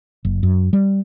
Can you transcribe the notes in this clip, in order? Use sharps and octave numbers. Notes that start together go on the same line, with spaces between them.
F#1
F#2
G3